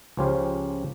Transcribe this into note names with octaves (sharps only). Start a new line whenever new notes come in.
C#2 F3 C#4 F4 G4 C5